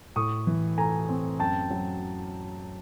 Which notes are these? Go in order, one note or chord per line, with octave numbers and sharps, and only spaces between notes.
A2 C#6 D#6
E3
A3 G#5 A#5
C4
F#2 G5 A5
F#3